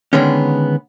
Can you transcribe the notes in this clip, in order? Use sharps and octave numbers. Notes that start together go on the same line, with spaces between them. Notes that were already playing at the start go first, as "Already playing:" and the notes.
D3 D#3 G#3 B3 C#4